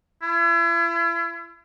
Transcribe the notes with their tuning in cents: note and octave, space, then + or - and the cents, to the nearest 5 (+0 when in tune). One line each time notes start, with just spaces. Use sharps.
E4 +40